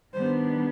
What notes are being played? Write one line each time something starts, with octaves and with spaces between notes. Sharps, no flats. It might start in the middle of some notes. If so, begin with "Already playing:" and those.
D#3 G3 B3 D4 C5